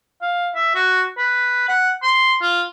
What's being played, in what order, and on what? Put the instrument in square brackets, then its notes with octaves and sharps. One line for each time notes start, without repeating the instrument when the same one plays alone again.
[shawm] F5
E5
F#4
B4
F#5
C6
F4